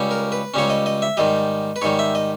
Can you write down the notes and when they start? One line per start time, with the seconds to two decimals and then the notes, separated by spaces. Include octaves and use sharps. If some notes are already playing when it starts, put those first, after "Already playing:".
Already playing: C#2 C#3 G3 C#4
0.11 A#4
0.32 B4
0.54 C#2 C#3 G3 C#4 C#5
0.70 D#5
0.86 D#5
1.02 E5
1.17 G#2 D#3 G3 D#5
1.76 B4
1.82 G#2 D#3 G3 C#5
1.99 E5
2.15 D#5